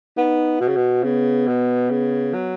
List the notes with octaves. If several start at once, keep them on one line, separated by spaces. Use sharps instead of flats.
B3 D#4
B2 F#4
C#3
B2
C#3 B3
B2
C#3
F#3